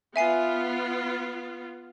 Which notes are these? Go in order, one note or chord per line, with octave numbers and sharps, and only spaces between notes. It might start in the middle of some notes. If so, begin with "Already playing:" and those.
B3 F4 E5 G#5 C7